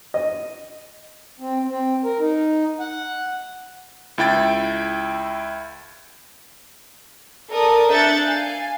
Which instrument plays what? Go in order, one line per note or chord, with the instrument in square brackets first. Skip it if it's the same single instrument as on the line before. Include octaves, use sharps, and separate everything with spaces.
[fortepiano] D#5
[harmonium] C4
C4
A#4
D#4
F#5
[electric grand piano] C#2 E4 G5 A6
[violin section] A4 A#4 D5 D#6
D4 E5 F#6 G6 A6 C#7
F5 G#5